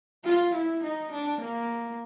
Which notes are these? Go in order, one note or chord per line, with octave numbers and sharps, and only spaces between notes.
F4
E4
D#4
D4
A#3